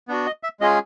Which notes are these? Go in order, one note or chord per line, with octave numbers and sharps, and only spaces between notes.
B3 D4 F#4
D#5
E5
G#3 C#4 F4 G#4 D#5